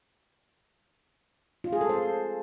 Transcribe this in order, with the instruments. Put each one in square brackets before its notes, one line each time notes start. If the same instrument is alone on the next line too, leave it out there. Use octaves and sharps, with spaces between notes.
[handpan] F4
G#4
A4
C5